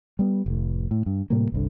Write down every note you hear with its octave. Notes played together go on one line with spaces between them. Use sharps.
G3 B3
F1 A2
A2
G2
A2 C3 G3 A#3
G1 C2 D3